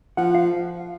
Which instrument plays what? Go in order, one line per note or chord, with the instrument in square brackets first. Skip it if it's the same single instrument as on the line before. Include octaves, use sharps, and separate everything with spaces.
[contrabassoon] F3 [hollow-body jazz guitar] F#5
[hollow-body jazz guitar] F5